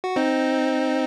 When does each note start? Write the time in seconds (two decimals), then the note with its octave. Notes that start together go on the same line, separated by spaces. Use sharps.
0.04 F#4
0.16 C4 D#4